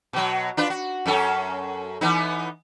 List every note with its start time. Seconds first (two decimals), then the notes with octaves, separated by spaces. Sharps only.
0.13 B2 F#3
0.57 D4 F4 B4
0.70 F#4
1.06 F#2 C#4 A4
2.01 E3 B3 D#4